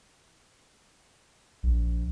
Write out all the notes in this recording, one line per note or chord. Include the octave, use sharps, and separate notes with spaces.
A#1